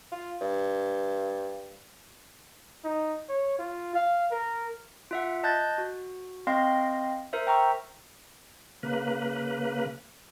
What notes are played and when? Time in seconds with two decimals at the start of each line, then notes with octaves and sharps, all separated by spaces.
0.12 F4
0.41 G2
2.84 D#4
3.29 C#5
3.59 F4
3.95 F5
4.31 A#4
5.11 F4 E5 F#5
5.43 D#5 A5 F#6 G6 A6
5.78 F#4
6.47 C4 D#5 F5 G5 C6 A#6
7.33 A#4 C5 E5
7.47 G5 A#5 C#6 E6
8.83 C#3 A#3 B4